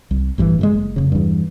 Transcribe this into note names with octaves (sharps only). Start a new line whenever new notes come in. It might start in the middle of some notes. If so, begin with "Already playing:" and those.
C2
A1 G2 D#3 E3
G2 E3 G#3
F#1
F1 C#3
E2 G2